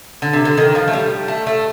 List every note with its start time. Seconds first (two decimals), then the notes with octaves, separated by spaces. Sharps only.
0.22 D3
0.33 C3
0.45 D3
0.57 D#3
0.75 F3
0.88 A3
0.93 G3
1.28 A3
1.47 A3